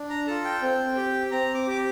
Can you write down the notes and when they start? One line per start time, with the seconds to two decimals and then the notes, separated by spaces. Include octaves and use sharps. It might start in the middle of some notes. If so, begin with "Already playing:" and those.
Already playing: D4
0.10 A#5
0.27 F4 A4 A5
0.44 G5
0.62 C4
0.96 G4
1.31 C4 A#5
1.54 D6
1.67 G4 D6